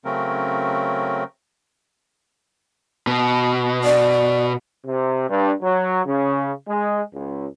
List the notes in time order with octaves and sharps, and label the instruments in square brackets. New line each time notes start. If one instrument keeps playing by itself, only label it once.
[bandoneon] C#3 F#3 A3 C4 C#4 A#4
[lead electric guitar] B2
[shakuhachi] D5
[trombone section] C3
G2
F#3
C#3
G#3
C#2